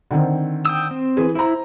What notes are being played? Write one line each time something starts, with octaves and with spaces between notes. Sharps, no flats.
D3 D#3 C4
G5 D#6 E6
C4
E3 G#4 B4
E4 C5 A#5